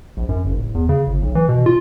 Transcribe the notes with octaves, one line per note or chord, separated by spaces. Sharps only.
A#1
F#2
F#1
D1
E2
C#3
G1
B1
E3
B2
F4